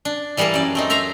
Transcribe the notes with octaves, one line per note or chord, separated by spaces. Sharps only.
D4
E3 G3 A#3 G#4 A#4 A5
F#2 D5
A3 C4 D#4
A#4 E5 A#5 C6